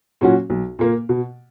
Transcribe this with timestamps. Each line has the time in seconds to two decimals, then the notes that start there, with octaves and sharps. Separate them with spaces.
0.21 A#2 F#3 C#4 F#4
0.50 B1
0.79 A#2 A#3
1.09 B2